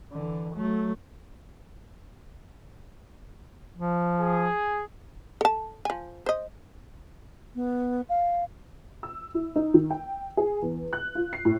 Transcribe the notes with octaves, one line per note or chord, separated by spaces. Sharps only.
D3 E3
F#3 A3
F3
G#4
A4 A5
F3 G#5
C5 D#5
B3
F5
E6
E4
D#4
D#3
G5
G#4
E2
F#6
F4
C7
A2